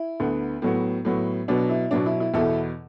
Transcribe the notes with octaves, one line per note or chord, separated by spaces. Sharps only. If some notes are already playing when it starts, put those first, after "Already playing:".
Already playing: E4
D2 D3 B3
A2 F#3 B3
A2 F#3 B3
B2 F#3 B3 D4
E4
B2 F#3 B3 D4
E4
E4
E2 B2 B3 E4 A4